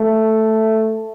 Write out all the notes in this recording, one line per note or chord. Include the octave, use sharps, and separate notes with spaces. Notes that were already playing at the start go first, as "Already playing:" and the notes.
Already playing: A3